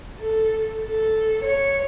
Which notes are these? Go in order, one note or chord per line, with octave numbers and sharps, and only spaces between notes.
A4
A4
C#5 C#7